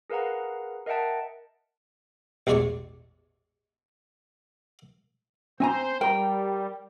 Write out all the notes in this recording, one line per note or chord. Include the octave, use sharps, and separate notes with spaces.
G#4 A#4 B4 F5 F#5 A#5
A#4 D#5 E5 F#5 G5 A5
A1 E2 G#3 C#5 D5 C#6
C4 C5 G#5 A#5
G3 A#4 G5 A#5